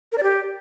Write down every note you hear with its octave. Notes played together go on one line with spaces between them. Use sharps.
A#4
D5
G4